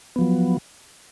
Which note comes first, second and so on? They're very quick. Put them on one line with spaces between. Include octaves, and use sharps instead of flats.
B3 F3 F#3